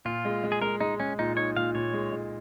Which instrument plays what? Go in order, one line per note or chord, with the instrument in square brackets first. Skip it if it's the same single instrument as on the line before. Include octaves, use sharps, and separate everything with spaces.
[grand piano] A#2 [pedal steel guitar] F4
[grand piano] G#3
G#3
[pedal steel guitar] G#4
[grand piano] G#3 [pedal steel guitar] A#4
[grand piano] G#3 [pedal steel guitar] D#4
[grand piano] G#3 [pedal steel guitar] C#4
[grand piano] A#2 [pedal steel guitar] D#4
[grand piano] D#4 [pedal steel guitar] C#5
[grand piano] A#2 [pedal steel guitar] F5
[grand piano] A#2 [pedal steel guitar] C#5
[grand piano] G#3
G#3